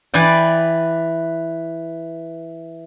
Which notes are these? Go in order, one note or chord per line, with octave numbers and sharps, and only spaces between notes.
E3 B4 D5 G5